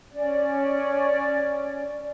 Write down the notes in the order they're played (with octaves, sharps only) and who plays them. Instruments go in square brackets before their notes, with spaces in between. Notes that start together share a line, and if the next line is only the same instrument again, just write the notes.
[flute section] C#4 D5